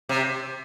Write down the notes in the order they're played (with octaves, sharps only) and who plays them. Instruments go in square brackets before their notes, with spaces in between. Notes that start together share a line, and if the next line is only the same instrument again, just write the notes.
[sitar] C3